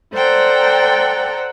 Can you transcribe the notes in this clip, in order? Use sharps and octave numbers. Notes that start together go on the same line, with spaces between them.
A4 C5 D5 F#5 G5 A#5